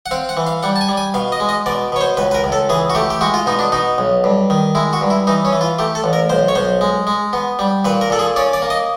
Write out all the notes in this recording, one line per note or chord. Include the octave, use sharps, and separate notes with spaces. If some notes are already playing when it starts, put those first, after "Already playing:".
F#5
C4 F5
F#5
E3
F5
G3 F#5
A5
G#5
G3
G#5
B2 F5
D#5
G#3
D#5
B2 D5
B2 C#5
C5
C#2 B4
B4
A#4
C#2
A4
E3 G#4
F#4
A3 G4
G4
G#3 F#4
F4
B2 D#4
D4
B2 D#4
B1
G2
D#3
G#3 E4
F#4
G2
E4
E3 D#4
C#4
E3
F4
A3 G4
A4
A1
A#4
B1 C5
C#5
B1 C5
G#3
G#3
B3
G3
A#2 B4
A#4
A#2 A4
G#4
C#4 D5
D5
A#3
D#5